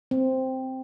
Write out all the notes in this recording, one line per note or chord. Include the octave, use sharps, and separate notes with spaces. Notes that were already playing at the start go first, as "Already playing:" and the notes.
C4